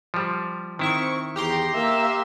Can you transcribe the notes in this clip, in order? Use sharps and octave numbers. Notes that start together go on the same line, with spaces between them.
F3 G3
D#3 C4 E4 C#6
E2 G4 A#5 C6
A#3 E5 F5